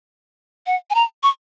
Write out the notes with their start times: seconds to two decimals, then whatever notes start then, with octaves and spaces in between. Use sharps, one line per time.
0.66 F#5
0.90 G#5
0.95 A#5
1.23 C#6